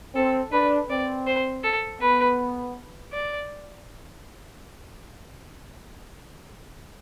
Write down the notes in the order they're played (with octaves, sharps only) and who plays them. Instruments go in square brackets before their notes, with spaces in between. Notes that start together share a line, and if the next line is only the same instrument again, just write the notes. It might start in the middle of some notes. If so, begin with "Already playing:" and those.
[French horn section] C4 [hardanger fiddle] A4
[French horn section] D4 [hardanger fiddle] B4
[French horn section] C4 [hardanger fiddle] D5
[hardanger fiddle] C5
A4
[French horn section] B3 [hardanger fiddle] B4
[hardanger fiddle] D5